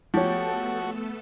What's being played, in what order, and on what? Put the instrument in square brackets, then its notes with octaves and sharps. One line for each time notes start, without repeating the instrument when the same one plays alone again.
[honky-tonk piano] F3 [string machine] A3 B3 A4 [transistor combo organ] F#4 [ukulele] G4 C#5